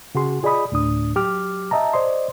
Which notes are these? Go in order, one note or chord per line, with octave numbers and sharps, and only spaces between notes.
C#3 F#4 G#4 C6
F4 G#4 D5 D#5 B5 D#6
D2 A2 D4 D#6
F#3 G4 D6 F6
D#5 E5 A5 A#5
C5 D5 D#5 C6